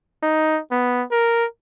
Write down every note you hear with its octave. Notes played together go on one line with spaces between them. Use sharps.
D#4
B3
A#4